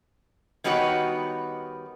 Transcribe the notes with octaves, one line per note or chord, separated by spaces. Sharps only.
D#3 G3 B3 D#4 F#4 C#5